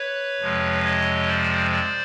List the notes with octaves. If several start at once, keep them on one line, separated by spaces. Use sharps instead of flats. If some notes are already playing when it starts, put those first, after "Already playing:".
Already playing: B4 C#5
F2 C3 F3 G#3
C#5 D#5
C5 D5
C5 D5